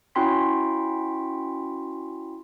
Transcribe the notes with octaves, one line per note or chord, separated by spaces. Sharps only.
C#4 E4 F#4 G5 C6 B6